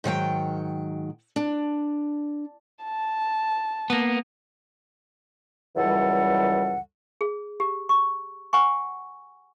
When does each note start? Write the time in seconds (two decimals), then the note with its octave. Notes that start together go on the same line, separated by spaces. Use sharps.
0.04 G#2 D#3 F#3 G5
1.36 D4
2.84 A5
3.90 A#3 B3
5.77 C#2 F#2 E3 G3 A4 F#5
7.21 G#4
7.60 G4
7.89 C#6
8.53 F#5 G#5 C#6